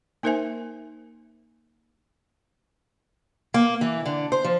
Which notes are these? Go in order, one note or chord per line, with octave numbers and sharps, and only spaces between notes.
A#3 D#4 A#4 C5 E5 G#5
A#3
E3
D3
C5
F3